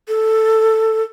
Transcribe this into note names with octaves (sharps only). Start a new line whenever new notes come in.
A4